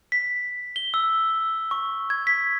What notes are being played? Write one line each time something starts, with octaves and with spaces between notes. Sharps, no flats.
B6
G7
E6
C#6
G#6
B6